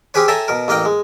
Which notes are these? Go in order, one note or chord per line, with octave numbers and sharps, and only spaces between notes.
C4 C#4 G4 G#4 B4 C#5
A4 C#5 E5 G5 G#5 A#5
B2 A#4
A1 A#3 D#5 F5 G5
G#3